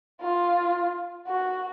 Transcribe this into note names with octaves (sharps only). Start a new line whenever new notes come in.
F4
F#4